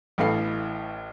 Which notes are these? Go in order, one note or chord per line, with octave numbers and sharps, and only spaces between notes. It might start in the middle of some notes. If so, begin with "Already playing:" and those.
A1 A2 A4 B4 F5 C7